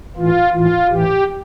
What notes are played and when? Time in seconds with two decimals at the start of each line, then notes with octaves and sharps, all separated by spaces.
0.16 A2 E3 F4
0.53 A2 E3 F4
0.90 A2 E3 G4